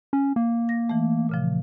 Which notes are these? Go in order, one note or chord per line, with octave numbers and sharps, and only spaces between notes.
C#4
A#3
A#6
E3 A3
A#2 C#3 F3